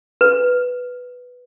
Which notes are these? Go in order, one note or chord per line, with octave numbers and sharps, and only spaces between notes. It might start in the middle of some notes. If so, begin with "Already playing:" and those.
B4